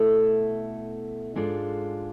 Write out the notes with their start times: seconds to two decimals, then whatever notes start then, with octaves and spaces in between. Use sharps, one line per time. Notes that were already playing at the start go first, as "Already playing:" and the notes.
Already playing: B2 A3 E4 A4
1.36 G#2 G#3 D4 F4 A4